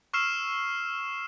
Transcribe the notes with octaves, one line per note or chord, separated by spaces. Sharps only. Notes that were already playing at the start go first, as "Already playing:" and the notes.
C#6 E6 F6 C7 E7